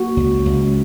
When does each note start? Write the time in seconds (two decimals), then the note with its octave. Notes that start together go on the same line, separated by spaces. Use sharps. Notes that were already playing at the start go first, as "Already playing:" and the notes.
Already playing: A#3 F#4
0.17 C#2
0.45 C#2